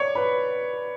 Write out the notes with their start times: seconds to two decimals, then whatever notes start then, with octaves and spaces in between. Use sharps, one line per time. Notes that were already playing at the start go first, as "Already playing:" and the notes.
Already playing: C#5 D5 C#6
0.15 B4 B5